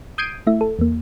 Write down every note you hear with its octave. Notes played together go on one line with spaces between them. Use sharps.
D#6 G6 G#6 C7 D7 D#7
A3 E4 E5
A4
E2 A#3